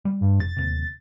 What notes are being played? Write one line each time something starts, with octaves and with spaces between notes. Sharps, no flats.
G3
G2
F1 A6
D1 D#2 C3